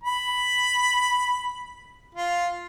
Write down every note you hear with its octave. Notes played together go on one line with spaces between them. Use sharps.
B5
F4